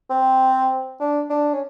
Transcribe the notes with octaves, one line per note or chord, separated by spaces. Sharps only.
C4
D4
D4
C#4